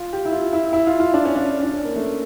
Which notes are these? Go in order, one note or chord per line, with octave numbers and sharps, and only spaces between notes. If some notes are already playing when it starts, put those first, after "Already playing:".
Already playing: F4
G4
E4
F4
E4
E4
F4
F4
D4
C#4
D4
D4
C#4
A#3
A3